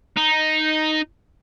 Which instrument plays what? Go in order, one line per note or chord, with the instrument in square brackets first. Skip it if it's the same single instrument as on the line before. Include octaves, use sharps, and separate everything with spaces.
[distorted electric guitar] D#4